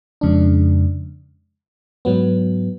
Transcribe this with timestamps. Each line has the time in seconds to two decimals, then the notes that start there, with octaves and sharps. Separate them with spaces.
0.21 F2 C#3 G#3 D4
2.05 G#2 F#3 B3